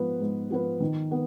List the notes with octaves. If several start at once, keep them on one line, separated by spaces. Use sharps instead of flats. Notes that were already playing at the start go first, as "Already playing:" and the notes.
Already playing: G#2 F3 B3 F4 B4
G#2
F3 B3 F4 B4
D#3
B3